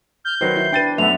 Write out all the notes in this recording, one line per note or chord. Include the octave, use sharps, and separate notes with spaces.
F6 G6
D#3 F#3 B4 C5 C7
E4
D4 B4 G5 A6 D#7
F#2 A3 B3 E5 F#5 F7